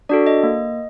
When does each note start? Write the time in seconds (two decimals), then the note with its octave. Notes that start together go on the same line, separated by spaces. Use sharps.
0.09 D4 F#4 A4 D5
0.27 D#5
0.43 A#3